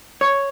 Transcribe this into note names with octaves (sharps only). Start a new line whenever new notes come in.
C#5